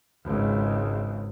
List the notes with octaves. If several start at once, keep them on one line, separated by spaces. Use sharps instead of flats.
G#1 C#2